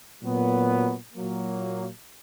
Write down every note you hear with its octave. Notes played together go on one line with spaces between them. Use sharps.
A#2 F#3 B3
A#2 F#3 A#3